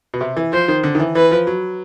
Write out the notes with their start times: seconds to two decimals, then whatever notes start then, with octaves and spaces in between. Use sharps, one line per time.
0.14 B2
0.21 C3
0.37 E3
0.53 F3 C5
0.68 D#3
0.83 D3
0.95 D#3
1.00 E3
1.15 E3 B4
1.31 F3
1.47 F#3